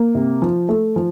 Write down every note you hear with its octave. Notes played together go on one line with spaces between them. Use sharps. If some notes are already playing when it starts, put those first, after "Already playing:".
Already playing: A#3
C3
F3
A3
F3